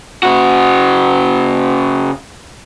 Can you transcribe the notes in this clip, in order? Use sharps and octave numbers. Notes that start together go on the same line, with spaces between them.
C#3 F#4